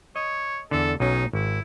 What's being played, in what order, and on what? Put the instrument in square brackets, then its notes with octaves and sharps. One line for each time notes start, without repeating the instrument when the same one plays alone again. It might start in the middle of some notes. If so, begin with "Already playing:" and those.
[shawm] C#5 [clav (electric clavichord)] D#5
[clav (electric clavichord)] E2 D3 [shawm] A4
[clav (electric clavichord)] B1 F#3 C#4 [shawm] D#4
[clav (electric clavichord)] G#1 [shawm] E4